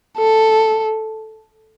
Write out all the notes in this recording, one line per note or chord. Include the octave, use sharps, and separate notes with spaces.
A4